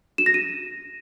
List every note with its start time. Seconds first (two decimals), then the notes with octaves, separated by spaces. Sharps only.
0.18 E7
0.26 A#6
0.34 D#7